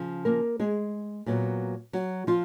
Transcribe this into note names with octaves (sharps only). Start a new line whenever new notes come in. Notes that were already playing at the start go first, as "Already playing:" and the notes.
Already playing: C#3 F3
A#3 A#4
G#3 G#4
A#2 F#3 B3
F#3 F#4
F3 F4